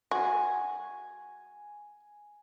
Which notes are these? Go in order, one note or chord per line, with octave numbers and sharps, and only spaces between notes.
F#4 G#5